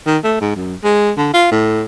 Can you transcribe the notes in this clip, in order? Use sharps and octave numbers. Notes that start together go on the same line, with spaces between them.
D#3
A3
G#2
F#2
G#3
D3
F4
A2